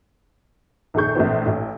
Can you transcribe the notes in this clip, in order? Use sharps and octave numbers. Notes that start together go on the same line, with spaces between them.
A#1 F2 D#3 G#4 C#6 G6
A#1 A2 E3 C4
A1